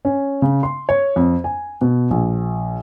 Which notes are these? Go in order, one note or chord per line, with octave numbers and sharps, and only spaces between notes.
C#4
C#3
C6
C#5
F2
G#5
B2
A#1